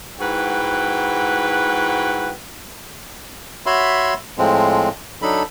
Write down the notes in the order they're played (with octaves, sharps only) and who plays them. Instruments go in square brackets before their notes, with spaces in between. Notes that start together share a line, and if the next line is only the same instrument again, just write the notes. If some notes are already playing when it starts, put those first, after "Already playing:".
[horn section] G#2 E4 F#4 B4 F#5 G5
[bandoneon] F#4 C#5 E5 B5 C6
A2 F3 G#3 C4
F#3 D4 D#4 A4 B5